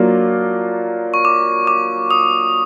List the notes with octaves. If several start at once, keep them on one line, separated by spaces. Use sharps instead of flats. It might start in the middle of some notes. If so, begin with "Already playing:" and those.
Already playing: F#3 A#3 D4 F4
C#6
D6
D6
D#6